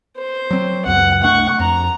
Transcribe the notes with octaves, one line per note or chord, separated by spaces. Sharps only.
C5
F#3 C4
C#2 F#2 F#5
C2 A3 D4 F#5 C#6
F2 A#5